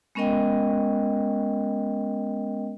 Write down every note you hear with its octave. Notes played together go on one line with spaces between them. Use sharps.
G#3 B3 C#4 A#4 D#5 G5